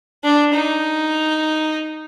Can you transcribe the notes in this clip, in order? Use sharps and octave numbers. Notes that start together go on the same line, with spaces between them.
D4
D#4